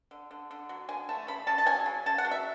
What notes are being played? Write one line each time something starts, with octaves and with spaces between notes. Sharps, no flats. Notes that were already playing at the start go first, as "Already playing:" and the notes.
D3
D3
D3
F#3
D3 G#5
A3 A5
C#3 B5
C#3 A5
A5
F#3 G#5
C#3
C#3 A5
F#5
F#3
E5